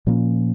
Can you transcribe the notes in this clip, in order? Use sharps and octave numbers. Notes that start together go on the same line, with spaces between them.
A#2 F3 A#3 C#4